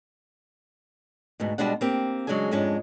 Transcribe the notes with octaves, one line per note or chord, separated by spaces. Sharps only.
D2 G#2 B2
B2 G3 G#3 D4 F#5
A#3 C4 G4
C#3 F#3 G#3 D4 G#4 G#5
F2 G#2 G#3 C#4 D4